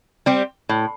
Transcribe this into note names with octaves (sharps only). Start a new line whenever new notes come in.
G3 C4 G4
A2